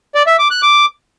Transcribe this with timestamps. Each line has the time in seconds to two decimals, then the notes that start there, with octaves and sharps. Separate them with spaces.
0.15 D5
0.27 E5
0.39 D6
0.51 F#6
0.63 D6